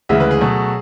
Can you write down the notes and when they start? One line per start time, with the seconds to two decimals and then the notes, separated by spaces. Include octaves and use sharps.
0.09 D2 C#3 E3 G#3 E5
0.20 B4
0.31 G#4
0.41 B2 F#3 A3